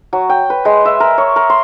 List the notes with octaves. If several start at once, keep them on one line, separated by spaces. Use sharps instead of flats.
F#3
G5
B4
G#3
E5
A#4
C#5
A#4
C6